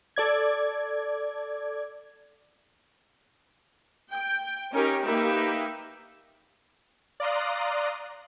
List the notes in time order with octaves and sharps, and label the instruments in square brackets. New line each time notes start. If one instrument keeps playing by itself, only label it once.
[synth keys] A4 D5 G#6
[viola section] G5
C#4 D#4 G4 A#4
A#3 D#4 G4 B4 E5
[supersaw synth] D5 F5 A#5 C6 D#6 F#6